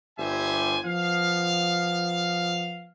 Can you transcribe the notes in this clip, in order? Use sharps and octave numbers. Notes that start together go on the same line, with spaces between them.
G1 G3 C5 E5 G#5
F3 B3 F5